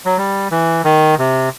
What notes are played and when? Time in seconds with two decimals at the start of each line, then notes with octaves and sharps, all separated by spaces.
0.05 F#3
0.18 G3
0.51 E3
0.85 D#3
1.19 C3